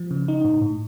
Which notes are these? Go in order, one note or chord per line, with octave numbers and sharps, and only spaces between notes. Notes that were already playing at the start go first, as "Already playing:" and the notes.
Already playing: F3
C#3
D#4
A2
A2